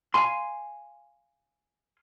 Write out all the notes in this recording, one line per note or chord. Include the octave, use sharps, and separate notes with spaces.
F5 G#5 C6